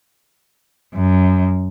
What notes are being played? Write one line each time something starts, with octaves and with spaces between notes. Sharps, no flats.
F#2